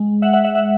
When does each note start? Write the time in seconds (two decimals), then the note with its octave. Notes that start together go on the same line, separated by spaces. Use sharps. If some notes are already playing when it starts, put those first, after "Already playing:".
Already playing: G#3
0.22 E5 F#5
0.33 E5 F#5
0.44 E5 F#5
0.55 E5 F#5